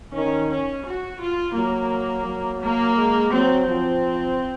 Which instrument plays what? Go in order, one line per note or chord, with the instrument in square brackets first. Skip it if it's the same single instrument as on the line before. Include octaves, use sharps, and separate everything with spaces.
[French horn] D#3 [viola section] C#4
[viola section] C#4
F#4
F4
[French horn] F#3 [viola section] A#3
[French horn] F#3
[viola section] A#3
[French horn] G#3
[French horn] F#3 [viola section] C4
[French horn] F3 [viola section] C4